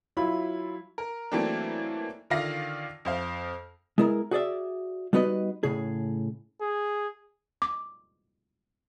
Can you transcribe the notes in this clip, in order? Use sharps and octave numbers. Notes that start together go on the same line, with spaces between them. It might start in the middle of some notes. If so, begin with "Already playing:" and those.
F#3 E4 F4 B5
A#4
E3 F#3 A3 A#3 C4 D4
D3 D#3 F4 D5 F5 A#6
F2 C5 F5
G#3 B3 E4 G#4 A#4
F#4 G#4 D5 E5
G3 B3 D#4 F#4 B4 D#5
A2 C#3 G#4
G#4
D6